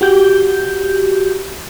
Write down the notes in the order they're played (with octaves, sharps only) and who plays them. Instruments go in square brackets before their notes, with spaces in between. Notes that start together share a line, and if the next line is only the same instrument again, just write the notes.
[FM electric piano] F#4 G4 G6